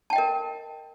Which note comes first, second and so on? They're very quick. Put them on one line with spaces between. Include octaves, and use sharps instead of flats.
A5 G5 D#5 A#4